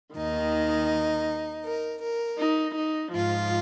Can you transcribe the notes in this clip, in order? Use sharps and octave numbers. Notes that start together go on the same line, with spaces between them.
D#2 D#3 D#4
A#4
A#4
D#4
D#4
G#2 F3 F4